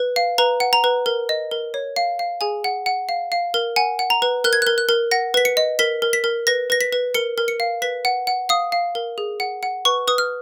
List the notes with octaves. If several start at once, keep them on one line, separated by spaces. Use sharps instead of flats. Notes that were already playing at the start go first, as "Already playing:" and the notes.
Already playing: B4
F5
B4 A#5
F#5
A#5
B4
A#4
D#5
A#4
C#5
F5
F5
G#4 G#5
F#5
F#5
F5
F5
A#4
F#5 G#5
F#5
A#5
B4
A#4 F#6
G#6
A#4 F#6
F#6
A#4
F#5 A#6
B4 B6
C#7
D#5
A#4 B6
A#4
B6
A#4
B4 A#6
B4 A#6
B6
B4
A#4 C#7
A#4
C#7
F5
B4 B6
F#5
F#5
F5 D#6
F5
A#4
G#4
F#5
F#5
B4 C#6
B4 D#6
F6